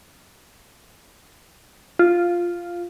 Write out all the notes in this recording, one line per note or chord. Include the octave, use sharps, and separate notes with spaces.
F4